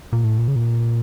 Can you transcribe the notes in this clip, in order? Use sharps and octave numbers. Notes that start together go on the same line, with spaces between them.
A#2
A2
A#2
C#3
A#2